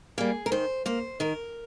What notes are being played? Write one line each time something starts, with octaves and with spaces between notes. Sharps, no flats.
G3 A#3 G#4
A#4
D#3 C5
A#3 C5
D#3 A#4